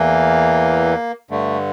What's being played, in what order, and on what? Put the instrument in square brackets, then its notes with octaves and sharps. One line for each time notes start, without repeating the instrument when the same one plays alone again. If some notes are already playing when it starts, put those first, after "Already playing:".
Already playing: [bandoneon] E2 E3 A#3
G2 D3 A3